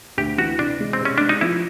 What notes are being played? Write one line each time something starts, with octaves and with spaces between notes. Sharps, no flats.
D2 G4
E3 F#4
C3 D4
G#3
C4
C3
C#4
G#3 D4
D#4
F3 E4